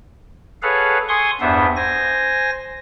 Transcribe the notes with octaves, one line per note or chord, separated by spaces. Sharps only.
G#4 A4 B4 C#5 F5 F#5
G#5 C6 C#6 D#6
E2 G2 B3 D4 C5 E5
C5 G#5 A#6